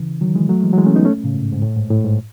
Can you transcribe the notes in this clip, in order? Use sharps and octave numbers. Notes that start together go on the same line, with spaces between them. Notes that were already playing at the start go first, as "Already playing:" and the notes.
Already playing: C#3 E3
D#3 F#3
E3 G#3
F#3 A3
E3 G#3
F#3
E3 G#3
A3 C#4
B3 D#4
A3 C#4
A2 C#3
G#2
G#2
A2
G#2
A2
G#2